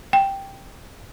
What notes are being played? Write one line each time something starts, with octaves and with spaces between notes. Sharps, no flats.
G5